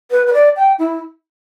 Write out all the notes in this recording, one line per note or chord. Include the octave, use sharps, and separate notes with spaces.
B4
B4
D5
G5
E4